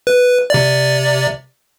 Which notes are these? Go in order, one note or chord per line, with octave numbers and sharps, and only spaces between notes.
B4
C3 D5